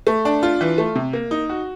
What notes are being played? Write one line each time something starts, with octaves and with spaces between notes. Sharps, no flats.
A3
D4
F4
E3
A3
C3
A#3
D#4
F#4